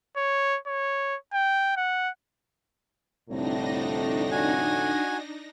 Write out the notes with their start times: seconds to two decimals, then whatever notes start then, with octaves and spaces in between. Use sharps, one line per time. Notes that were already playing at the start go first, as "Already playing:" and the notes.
0.17 C#5
0.67 C#5
1.33 G5
1.77 F#5
3.29 C2 F2 A2 D3 D4 D#4 A#6
4.31 F#4 G#5